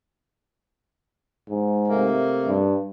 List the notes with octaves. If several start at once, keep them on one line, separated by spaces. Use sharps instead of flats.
G#2
C3 A3 A#3
G2